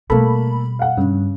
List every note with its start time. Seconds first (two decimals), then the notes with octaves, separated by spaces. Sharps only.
0.10 B2 G3 A3 A#3 A4 B5
0.79 F5 F#5
0.97 G2 C#3